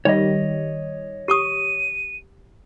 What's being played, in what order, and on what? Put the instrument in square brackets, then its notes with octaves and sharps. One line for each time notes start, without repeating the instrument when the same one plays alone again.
[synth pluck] D#3 G3 [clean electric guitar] C#5 D#5
[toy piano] G4 C#6 D#6 [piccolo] D#7